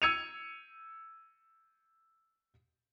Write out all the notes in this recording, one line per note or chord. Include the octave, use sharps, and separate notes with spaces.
E6 G#6 C#7 D#7 F7